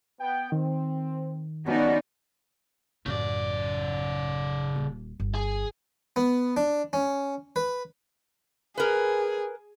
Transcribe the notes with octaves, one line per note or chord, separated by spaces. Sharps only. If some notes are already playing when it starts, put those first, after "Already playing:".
B3 G5
D#3 C4
F3 G3 B3 C#4 D#4 F#4 D5
A1 F#2 C#3 D5
D#1
G1
G#4
B3
D4
C#4
B4
G#4 A#4 B4